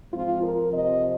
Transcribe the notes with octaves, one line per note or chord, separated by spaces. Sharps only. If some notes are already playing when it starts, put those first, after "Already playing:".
G#2 F3 C4 F4
A#4
C3 F3 C4 D#5